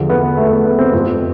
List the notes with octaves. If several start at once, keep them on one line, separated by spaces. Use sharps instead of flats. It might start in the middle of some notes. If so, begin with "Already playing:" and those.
Already playing: E2 D3 F3
B3
A3
B3
B3
C4
F2 C3 F3 C4